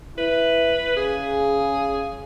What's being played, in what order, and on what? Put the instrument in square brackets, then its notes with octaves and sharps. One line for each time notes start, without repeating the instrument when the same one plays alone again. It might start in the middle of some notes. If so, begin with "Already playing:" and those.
[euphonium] E4 [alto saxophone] B4
[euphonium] C#3 [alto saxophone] G#4